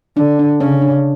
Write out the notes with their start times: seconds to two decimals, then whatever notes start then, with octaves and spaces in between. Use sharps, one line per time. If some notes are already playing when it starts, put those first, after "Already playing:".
0.17 D3 D4
0.39 D4
0.60 C#3 C#4
0.82 D4